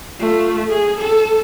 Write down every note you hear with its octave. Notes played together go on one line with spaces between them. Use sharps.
A3 F4
G#4
A4